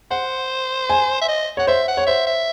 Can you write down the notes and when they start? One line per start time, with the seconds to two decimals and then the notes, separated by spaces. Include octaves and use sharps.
0.11 C5 F#5
0.90 G#5
1.21 E5
1.28 D#5
1.57 C#5 F#5
1.67 C5 E5
1.88 F#5
1.97 C#5
2.07 C5 E5
2.27 E5